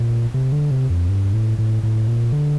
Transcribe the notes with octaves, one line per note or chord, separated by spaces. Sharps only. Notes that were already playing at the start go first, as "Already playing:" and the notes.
Already playing: A#2
C3
D3
C3
F2
G2
A2
A2
A2
A#2
D3